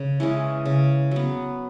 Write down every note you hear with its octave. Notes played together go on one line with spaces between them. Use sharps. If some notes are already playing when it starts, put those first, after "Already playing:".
Already playing: C#3
E3 G#3 C#4
C#3
F#3 B3